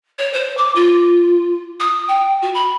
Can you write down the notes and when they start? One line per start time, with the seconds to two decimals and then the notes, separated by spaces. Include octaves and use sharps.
0.19 C#5
0.33 C5
0.57 D6
0.75 F4
1.80 D#6
2.08 G5
2.42 F#4
2.55 B5